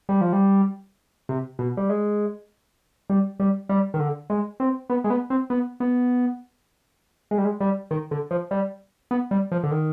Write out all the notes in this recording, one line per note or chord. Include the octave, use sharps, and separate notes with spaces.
G3
F3
G3
C3
B2
G3
G#3
G3
G3
G3
D#3
D3
G#3
C4
B3
G#3
B3
C4
B3
B3
G#3
G3
G#3
G3
D#3
D3
F3
G3
B3
G3
F3
D3
D#3